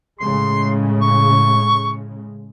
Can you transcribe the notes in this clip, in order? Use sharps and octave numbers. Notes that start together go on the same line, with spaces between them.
A2 C#3 G#3 C6
C#6